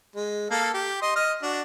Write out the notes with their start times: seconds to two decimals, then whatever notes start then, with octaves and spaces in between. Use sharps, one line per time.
0.16 G#3
0.50 A#3 A4 F5
0.74 G4
1.02 D#5 C6
1.16 D#5 F6
1.42 D4 F#4